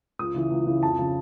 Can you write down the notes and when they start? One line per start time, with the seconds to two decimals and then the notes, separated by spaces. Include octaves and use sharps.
0.19 C#2 D#6
0.34 C#3 E3
0.51 C#2
0.67 C#3 E3
0.83 F2 A5
0.99 C#3 F3